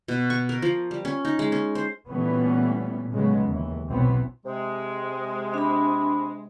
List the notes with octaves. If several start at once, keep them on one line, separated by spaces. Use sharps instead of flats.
B2
C#6
A#4
F3
G3
C#4
D#4
G#3
C#4
C5
A#2 E3 G3 A3 B3 C#4
A2 C#3 F#3 G#3 B3
D#2 E3
B1 C3 E3 F#3 B3 C4
C3 G#3
D4 B5